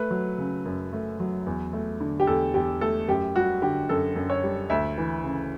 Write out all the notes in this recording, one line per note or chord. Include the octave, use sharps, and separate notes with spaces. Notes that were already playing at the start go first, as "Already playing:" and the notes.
Already playing: A3 B4
F#3
C#3
F#2
A3
F#3
E2
A3
D3
G4
E2 A4
E2 G4
A3 A4
F#2 G4
G3 F#4
D3 G4
F#2 A4
F#2
C#5
G3
D2 E5
E3
C#3